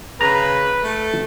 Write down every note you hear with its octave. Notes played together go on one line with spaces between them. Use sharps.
C#3 B4 A#5
A3